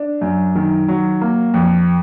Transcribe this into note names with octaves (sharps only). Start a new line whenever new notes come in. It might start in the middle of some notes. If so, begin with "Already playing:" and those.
Already playing: D4
F#2
D#3
F#3
A#3
F2